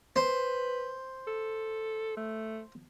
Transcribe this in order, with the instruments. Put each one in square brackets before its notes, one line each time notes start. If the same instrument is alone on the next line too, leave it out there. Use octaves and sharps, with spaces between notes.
[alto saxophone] B4 [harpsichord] C5
[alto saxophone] A4
A3